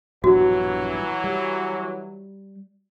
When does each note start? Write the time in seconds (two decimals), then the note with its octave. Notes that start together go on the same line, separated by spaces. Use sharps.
0.24 A#1 G2 B2 E3 F#3 F#4
1.24 G3